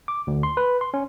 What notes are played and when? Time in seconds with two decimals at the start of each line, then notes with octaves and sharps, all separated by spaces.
0.08 D6
0.27 D2
0.43 C6
0.57 B4
0.81 C6
0.94 C#4